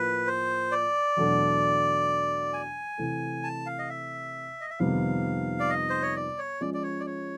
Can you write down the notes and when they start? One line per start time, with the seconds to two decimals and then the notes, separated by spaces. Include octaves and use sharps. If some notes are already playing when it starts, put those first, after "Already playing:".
Already playing: A2 F3 A#3 B4
0.27 C5
0.72 D5
1.17 E2 B2 F#3 A3 D4
2.53 G#5
2.98 C3 E3 A3
3.44 A5
3.66 F5
3.79 D#5
3.89 E5
4.61 D#5
4.70 E5
4.79 F2 C3 D#3 G3 B3 F5
5.60 D5
5.70 D#5
5.90 C5
6.02 C#5
6.16 D5
6.38 C#5
6.61 F3 G#3 C#4 D5
6.74 D5
6.83 C#5
7.00 D5
7.06 C#5